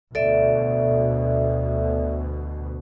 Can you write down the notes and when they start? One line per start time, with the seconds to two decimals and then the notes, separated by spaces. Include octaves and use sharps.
0.15 D2 B2 A4 D5 E5